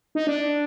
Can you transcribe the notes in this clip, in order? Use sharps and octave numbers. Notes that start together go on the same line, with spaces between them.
D#4
D4